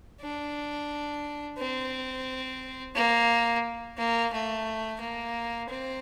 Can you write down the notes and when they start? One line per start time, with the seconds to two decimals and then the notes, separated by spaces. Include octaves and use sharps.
0.21 D4
1.58 C4
2.95 A#3
3.98 A#3
4.33 A3
5.01 A#3
5.69 C4